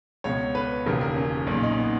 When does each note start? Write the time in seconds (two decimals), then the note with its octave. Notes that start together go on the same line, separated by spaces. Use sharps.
0.24 C#2 B2 C#5
0.55 B4
0.86 E1 D#2 C#3 A#4
1.01 A#4
1.16 C#4
1.47 B1 A#2 C#4
1.63 D#4
1.78 B3